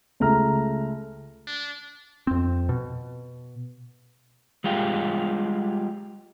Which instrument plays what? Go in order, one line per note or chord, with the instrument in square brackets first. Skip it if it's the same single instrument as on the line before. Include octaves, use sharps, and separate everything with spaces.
[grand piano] C#2 A3 A#5 F6
[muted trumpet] D4
[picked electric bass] F2 C4
B2
[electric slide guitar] G3 G#3 F4 G4